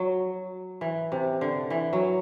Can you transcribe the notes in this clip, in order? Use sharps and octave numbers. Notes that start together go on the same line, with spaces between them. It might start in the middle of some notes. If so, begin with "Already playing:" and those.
Already playing: F#3
E3
C3
D3
E3
F#3